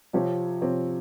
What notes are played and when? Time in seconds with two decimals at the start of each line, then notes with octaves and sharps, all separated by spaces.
0.13 C3 F3 C4 G4 C#5
0.62 C3 F3 C4 G4 C#5